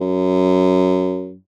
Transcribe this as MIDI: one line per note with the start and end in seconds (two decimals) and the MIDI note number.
0.01 1.35 42